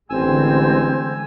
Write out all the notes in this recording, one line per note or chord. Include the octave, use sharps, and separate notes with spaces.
A1 D3 E3 G#3 C4 G#5 E6